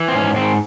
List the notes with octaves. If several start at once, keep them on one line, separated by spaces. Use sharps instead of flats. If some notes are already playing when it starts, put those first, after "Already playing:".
Already playing: E3
C4
G#2 C#4
G#2 C4